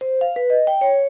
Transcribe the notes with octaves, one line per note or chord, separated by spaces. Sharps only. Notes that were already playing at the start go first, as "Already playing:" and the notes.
C5
F5
B4
D#5
G5
C#5